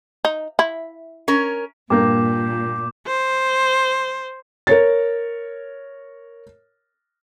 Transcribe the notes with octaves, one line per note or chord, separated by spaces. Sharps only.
D#4
E4
C#4 A#4
G2 A#2 A#3 D6 G6
C5
A#4 C#5 A6